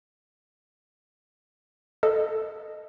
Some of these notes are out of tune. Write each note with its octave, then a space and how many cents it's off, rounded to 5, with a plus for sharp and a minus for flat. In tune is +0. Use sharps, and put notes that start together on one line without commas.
A4 +0 D#5 -10